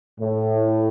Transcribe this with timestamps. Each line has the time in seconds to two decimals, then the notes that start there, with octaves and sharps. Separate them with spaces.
0.21 A2